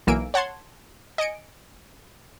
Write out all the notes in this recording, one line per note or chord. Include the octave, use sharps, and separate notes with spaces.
B1 E3 A#3 G#5 E6 D7
C#5 F#5 A5 C6 G#6
D#5 G#5 C#7 D7